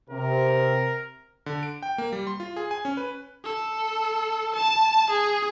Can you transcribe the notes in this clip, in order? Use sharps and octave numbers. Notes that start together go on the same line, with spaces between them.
C3 A#4
D3
D7
G5
A#3
G3
C6
F4
G#4
G#5
C#4
B4
A4
A5
G#4